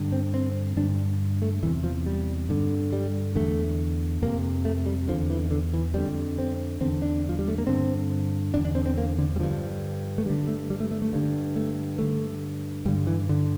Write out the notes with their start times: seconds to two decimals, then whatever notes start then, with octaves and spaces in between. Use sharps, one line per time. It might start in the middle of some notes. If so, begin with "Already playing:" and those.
Already playing: G2 D3
0.12 C4
0.34 C4
0.77 G2 D3 D4
1.42 A3
1.63 E2 C3 E3
1.84 F3
2.06 G3
2.49 G2 D3
2.93 G3
3.35 E2 D3 A3
4.22 F2 C3 A#3
4.65 A3
4.86 G3
5.08 E2 D3 F3
5.30 E3
5.51 D3
5.74 E3
5.94 F2 D3 G3
6.38 C4
6.81 E2 D3 C4
7.02 D4
7.29 F3
7.39 G3
7.48 A3
7.58 A#3
7.67 G2 D3 C4
8.54 E2 D3 D4
8.65 D4
8.75 C4
8.86 C4
8.97 A#3
9.19 D3
9.36 G3
9.39 G2 D3 F3
10.18 A3
10.26 G2 D3 G3
10.48 A3
10.70 G3
10.80 A3
10.91 A3
11.02 A3
11.13 G2 D3
11.56 A3
11.99 G2 D3 A3
12.85 G2 D3 G3
13.07 E3
13.29 D3